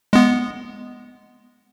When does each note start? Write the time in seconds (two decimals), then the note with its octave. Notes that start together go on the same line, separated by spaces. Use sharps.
0.13 G#3 B3